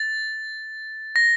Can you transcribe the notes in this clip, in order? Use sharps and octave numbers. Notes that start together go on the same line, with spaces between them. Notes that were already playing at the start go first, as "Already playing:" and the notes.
Already playing: A6
A#6